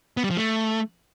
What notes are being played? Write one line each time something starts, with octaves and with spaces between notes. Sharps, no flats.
B3
G3
F3
A3